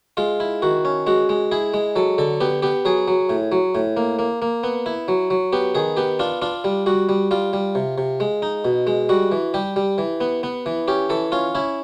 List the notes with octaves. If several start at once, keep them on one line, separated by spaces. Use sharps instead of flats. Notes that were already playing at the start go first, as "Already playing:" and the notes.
G#3 F4
E4
D#3 F#4
C#4
G#3 F#4
G#3
E4 G#4
G#3
F#3 A4
D3 A4
B3 G4
B3 G4
F#3 G#4
F#3
A2
F#3
A2
A#3
A#3
A#3
B3
E4
F#3
F#3
B3 G4
D#3 G#4
B3 G4
D4 F4
D4 F4
G3
G3 F#4
G3
G3 F4
G3
C3
C3
G#3
D#4
B2
G#3
G3 F#4
E3
G3 G4
G3
E3
B3
B3
E3
C#4 G4
E3 A4
C#4 F4
C#4 E4